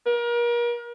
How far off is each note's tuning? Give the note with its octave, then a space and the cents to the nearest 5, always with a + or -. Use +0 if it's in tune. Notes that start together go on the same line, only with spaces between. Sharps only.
A#4 +35